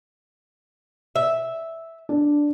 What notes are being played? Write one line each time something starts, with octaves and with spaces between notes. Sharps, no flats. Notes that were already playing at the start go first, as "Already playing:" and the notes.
E5
D4